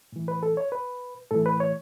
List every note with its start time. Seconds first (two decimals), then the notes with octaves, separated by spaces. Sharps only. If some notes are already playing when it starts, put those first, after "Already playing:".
0.12 A2 E3
0.28 B4
0.43 A4
0.57 C#5
0.72 B4
1.31 A2 E3 A4
1.46 B4
1.60 C#5